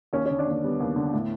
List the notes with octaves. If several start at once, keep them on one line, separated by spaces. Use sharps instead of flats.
D#2 C#4
D3 C#4
D4
D#2 C#4
G3 B3
D#2
D3
A2